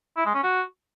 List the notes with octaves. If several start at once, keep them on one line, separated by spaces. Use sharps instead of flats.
E4
G#3
C#4
F#4